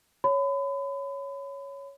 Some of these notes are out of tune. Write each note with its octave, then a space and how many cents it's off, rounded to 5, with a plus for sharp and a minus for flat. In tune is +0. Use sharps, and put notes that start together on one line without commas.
C#5 +0 B5 +35